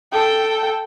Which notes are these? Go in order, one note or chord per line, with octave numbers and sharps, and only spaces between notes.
A4 G5